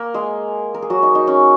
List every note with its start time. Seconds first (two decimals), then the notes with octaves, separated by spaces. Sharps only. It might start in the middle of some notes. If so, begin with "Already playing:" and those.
Already playing: A#3 A#4
0.14 G#3 G#4
0.75 A#4
0.82 G#4
0.90 F#3 F#4
1.03 D#4
1.15 D#4
1.27 C#4